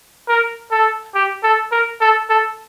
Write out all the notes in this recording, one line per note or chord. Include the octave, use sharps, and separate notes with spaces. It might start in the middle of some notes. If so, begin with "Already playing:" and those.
A#4
A4
G4
A4
A#4
A4
A4